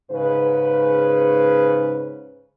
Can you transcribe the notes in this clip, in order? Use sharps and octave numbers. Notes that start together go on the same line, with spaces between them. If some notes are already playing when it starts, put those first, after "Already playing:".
G#2 C#3 B4